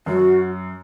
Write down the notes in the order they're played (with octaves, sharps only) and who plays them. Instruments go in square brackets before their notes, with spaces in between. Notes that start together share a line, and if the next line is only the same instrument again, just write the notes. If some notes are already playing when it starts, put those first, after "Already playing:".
[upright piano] F#2 [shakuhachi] F#4